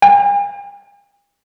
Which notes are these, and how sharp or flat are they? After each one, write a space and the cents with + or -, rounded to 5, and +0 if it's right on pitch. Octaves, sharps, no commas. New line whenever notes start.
G#5 -45